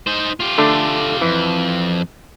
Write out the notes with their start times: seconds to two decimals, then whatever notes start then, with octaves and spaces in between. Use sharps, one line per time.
0.07 D#4 C5
0.40 F4 G4
0.58 D3 A3 D4
1.21 F2 E3